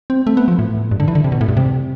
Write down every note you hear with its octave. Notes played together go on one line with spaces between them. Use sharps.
C4
A3
B3
F3
A2
G2
D3
E3
D3
C3
B2
A2
G2
C3